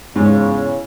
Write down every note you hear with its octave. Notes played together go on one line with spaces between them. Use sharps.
E2 G#2 C#3 C#5